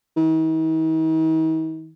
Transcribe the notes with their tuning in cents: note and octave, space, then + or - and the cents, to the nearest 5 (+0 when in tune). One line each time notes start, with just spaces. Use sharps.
D#3 +45